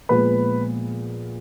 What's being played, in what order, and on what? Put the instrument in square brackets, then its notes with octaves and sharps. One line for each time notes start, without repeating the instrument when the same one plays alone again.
[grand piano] A#2 F3 G#3 B3 B4 B5